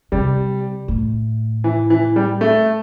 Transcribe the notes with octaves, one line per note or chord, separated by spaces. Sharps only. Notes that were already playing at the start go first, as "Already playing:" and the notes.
C3 G3
A2
E3
E3
G3
A3